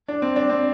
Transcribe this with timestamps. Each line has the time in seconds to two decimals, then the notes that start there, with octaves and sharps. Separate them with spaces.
0.08 D4
0.22 C4
0.36 D4
0.50 C4